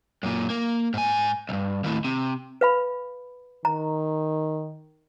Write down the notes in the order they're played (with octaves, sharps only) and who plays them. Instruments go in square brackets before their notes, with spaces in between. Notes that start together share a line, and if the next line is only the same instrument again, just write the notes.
[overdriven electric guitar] F#2 A#2
A#3
G#2 G#5
B1 G2
D#2 A2
C3
[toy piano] B4 F5 B5
[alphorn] D#3 [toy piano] A#5